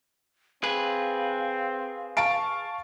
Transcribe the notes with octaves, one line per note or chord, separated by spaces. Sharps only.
C4 G#4 B4 F5
F5 A5 C#6 D7